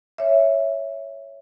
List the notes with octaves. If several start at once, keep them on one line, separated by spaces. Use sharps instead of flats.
C#5 E5